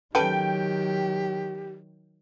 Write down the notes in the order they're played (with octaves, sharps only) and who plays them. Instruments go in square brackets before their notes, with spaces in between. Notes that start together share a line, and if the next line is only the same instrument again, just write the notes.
[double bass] D#3 F#3 [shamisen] C#4 A4 B4 [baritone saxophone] G4 [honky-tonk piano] G5